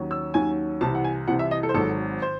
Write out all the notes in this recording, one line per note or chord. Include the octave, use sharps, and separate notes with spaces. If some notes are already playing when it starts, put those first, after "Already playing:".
Already playing: D#2 D#3 F#3 C#4
E6
D#2 D#3 F#3 C#4 G#5
C2 C3 E3 A5
F#5
G#5
C2 C3 E3 F#5
E5
D#5
A4
C5
G#1 G#2 F#3 A4
C5